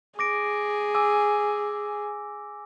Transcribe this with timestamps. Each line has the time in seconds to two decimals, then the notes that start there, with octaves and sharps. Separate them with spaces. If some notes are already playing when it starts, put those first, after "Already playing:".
0.19 G#4 D6 A#6 D7
0.95 G#5 D6 E6